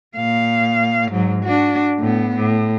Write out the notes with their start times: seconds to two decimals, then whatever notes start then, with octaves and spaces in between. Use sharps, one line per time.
0.17 A#2 F5
1.11 G#2 F#3
1.44 D4 F#4
1.99 A2 B3
2.36 A2